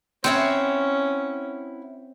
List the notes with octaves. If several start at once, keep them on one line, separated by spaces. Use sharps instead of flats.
C4 C#4 E4 C#5 F#5